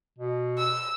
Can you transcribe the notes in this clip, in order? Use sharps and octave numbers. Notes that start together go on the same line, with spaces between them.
B2
E6